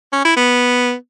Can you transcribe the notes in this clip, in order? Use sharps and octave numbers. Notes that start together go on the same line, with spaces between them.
C#4
E4
B3